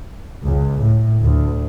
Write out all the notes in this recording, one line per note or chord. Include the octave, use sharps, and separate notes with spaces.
C#2
A2
D2